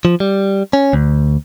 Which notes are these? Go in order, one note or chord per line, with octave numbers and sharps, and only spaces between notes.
F3
G3
C#4
D2